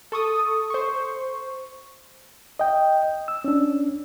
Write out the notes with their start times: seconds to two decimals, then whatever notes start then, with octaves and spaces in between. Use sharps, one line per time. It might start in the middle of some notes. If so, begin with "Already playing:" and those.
0.12 A4 C#6 D#6
0.70 C5 C#6
2.59 D#5 G5
3.28 E6
3.44 C#4 D4